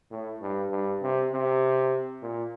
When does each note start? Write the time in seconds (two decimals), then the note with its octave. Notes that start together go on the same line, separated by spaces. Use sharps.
0.11 A2
0.41 G2
0.71 G2
1.02 C3
1.32 C3
2.22 A#2